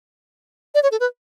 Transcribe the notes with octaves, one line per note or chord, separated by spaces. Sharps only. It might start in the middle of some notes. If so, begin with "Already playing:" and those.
D5
C#5
A4
B4